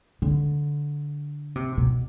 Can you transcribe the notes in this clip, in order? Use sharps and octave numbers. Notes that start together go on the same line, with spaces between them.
D3
C3
B2